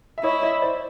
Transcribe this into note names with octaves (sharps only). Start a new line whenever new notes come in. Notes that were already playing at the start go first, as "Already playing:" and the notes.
E5
E4 C#5 D#5
C#5 D#5
C5 D5